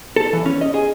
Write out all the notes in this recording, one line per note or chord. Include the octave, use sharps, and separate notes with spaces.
A4
E3
C#4
D#5
G#4